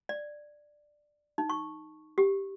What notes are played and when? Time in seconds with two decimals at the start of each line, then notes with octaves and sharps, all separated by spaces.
0.09 D5
1.38 D#4
1.50 C#6
2.18 G4